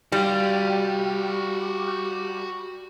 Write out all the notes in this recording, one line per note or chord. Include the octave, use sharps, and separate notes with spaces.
G3 F#4 F5